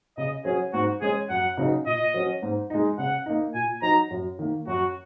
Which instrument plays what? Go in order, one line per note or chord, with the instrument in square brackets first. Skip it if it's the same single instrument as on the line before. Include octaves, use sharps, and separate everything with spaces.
[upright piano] C#3 [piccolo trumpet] D#5
[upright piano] F#3 C#4 [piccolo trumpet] G#4
[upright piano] G#2 [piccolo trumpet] F#4
[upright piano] G#3 C#4 [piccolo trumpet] G#4
[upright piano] F#2 [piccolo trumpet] F#5
[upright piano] C#3 F#3 D#4
[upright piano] A#2 [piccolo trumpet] D#5
[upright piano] F#3 C#4
G#2
G#3 D#4
[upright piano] C#3 [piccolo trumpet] F#5
[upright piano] A#3 D#4
[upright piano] A#2 [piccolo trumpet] G#5
[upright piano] F#3 D#4 [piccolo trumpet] A#5
[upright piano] F#2
D#3 A#3
[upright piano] F#2 [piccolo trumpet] F#4